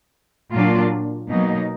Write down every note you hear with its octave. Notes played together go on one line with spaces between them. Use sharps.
A#2 F#3 A#3 D4 F4
B2 F#3 A#3 D#4